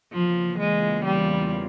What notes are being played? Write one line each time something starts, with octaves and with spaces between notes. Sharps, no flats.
E2 C#3 E3 F3 A#3 F4
G#3
G3